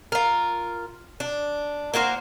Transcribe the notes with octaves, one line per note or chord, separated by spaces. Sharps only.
F4 A#4
D4
A#3 F#4 A#4 C5